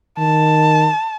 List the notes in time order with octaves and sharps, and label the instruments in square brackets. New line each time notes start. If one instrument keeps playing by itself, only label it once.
[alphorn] D#3 [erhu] A5